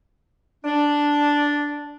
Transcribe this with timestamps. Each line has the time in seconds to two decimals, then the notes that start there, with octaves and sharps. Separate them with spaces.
0.64 D4